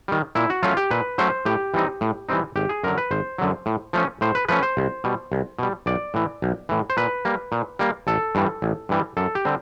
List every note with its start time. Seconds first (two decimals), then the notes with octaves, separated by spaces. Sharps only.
0.08 D#3 G3
0.35 A#2 E4
0.50 F#4
0.63 F#3 A3 C#4 F4
0.77 G4
0.91 A#2 B4
1.18 F#3 A3 C#4 C5
1.45 A2 G4
1.74 E3 G3 C4 D#4
2.01 A2
2.29 E3 G3 C4 D#4
2.56 G#1 G4
2.69 G#4
2.84 F#2 D3 F#3 A#4
2.98 B4
3.11 G#1 C5
3.38 F#2 D3 F#3
3.66 A2
3.93 F3 A3 C#4
4.21 A2 C5
4.35 B4
4.48 F3 A3 C#4 B4
4.63 C5
4.77 C2
5.04 B2 G3
5.32 C2
5.59 B2 G3
5.86 B1 D5
6.14 A2 E3
6.42 B1
6.69 A2 E3
6.90 C5
6.97 A#2 B4
7.25 G3 A#3
7.52 A#2
7.79 G3 A#3
8.07 A1 A4
8.35 G2 E3 G3
8.62 A1
8.89 G2 E3 G3
9.17 F#2 A4
9.35 G4
9.45 D3 G3 C4